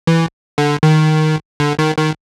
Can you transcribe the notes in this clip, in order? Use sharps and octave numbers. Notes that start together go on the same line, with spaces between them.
E3
D3
D#3
D3
D#3
D#3